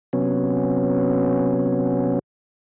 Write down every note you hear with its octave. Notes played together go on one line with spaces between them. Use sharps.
C3 F#3 B3 C#4